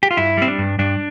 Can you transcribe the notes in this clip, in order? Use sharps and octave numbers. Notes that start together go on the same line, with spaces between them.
G4
F4
G2 E4
G3 C4
D4
G2
G2 D4